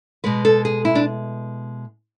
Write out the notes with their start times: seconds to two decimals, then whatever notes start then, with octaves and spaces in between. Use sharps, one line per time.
0.24 B2 G#3 B4
0.45 A4
0.65 G#4
0.85 E4
0.95 D4